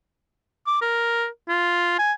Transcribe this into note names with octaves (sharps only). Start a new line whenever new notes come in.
D6
A#4
F4
G#5